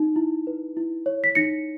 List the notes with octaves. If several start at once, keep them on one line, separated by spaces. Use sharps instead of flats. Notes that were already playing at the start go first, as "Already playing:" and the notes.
Already playing: D#4
E4
B4
E4
C#5
B6
D#4 A#6 C#7